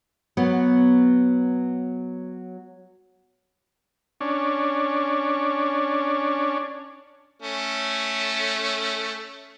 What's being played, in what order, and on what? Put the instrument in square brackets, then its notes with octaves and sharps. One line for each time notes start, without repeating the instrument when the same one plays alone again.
[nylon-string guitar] F#3 B3
[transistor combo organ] C#4 D4
[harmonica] A3 C#4